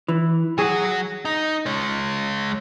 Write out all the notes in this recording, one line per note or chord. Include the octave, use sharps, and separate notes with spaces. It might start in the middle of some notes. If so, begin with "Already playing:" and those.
E3
F#3 F#4 G#4
D#4
G#3 C#5